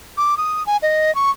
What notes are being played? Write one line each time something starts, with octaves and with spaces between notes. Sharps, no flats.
D6
D#6
G#5
D#5
C#6